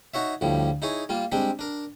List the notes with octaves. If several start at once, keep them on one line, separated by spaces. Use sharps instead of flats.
D#4 F#4 C#5 E5
D2 A2 F3 G3
D#4 E4 G#4 C#5
G3 A#3 F4
G3 G#3 C4 D4 G4
D4 A#4